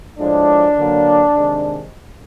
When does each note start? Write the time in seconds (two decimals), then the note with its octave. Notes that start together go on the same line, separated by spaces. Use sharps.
0.18 A2 F3 G#3 D4
0.76 D3 F#3 A#3
1.33 C3 D#3 G#3